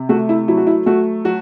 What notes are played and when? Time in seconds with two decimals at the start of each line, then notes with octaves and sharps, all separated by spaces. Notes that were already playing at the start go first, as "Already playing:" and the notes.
Already playing: C3
0.09 A3 F#4
0.29 E4
0.48 F#3 E4
0.57 F#4
0.67 E4
0.86 A3 F#4
1.25 F#3 F#4